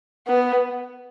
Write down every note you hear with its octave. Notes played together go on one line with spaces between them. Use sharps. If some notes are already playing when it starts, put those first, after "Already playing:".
B3